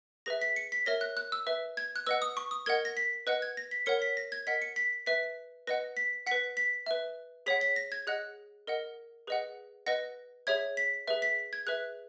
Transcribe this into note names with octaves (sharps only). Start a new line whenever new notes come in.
G#4 B4 E5 A#6
B6
C#7
B6
A#4 C#5 E5 A#6
F#6
F#6
E6
B4 E5
G#6
F#6
B4 D#5 F#5 E6
D#6
C#6
D#6
A#4 D#5 F#5 G#6
A#6
B6
B4 D#5 F#5 F#6
G#6
A#6
B6
A#4 C#5 F#5 C#7
B6
A#6
G#6
A#4 D#5 F#5 B6
C#7
B6
B4 E5 B6
B4 D#5 F#5 A#6
B6
B4 F#5 B6
B6
B4 E5
G#4 C#5 F#5 B6
B6
A#6
G#6
G#4 D#5 F#5 F#6
A#4 D#5 F#5
G#4 B4 D#5 F#5
B4 D#5 F#5 A#6
G#4 C#5 E5 G#6
B6
G#4 B4 E5
B6
G#6
G#4 B4 E5 F#6